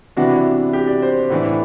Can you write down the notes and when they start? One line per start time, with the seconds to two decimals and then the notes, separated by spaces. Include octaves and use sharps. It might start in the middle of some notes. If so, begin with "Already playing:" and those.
0.16 C3 E3 B3 D4 F#4
0.73 G4
0.87 D5
1.02 C5
1.30 A2 E3 B3 D4